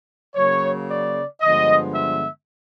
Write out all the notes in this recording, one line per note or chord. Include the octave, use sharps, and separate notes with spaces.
C#3 F#3 A#3 C#5
D5
G2 D3 F3 G#3 B3 D#5
E5